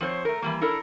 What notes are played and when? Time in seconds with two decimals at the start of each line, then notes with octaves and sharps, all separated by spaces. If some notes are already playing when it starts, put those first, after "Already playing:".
0.01 F3 C4 C5 C#5
0.25 A3 A#4
0.42 E3 G3 A#3
0.61 D4 E4 A4 A#4